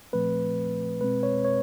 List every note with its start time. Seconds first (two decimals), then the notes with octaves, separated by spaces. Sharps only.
0.13 A#2 F3 A3 C4 B4
1.01 B2 G#3 C4 B4
1.23 C#5
1.45 C#5